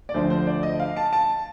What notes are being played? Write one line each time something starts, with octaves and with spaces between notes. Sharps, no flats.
D5
D2 D3 F3 C5
C5
D5
D#5
F5
A5
A5